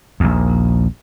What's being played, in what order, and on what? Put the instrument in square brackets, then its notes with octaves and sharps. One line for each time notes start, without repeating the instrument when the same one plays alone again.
[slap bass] A#1 D#2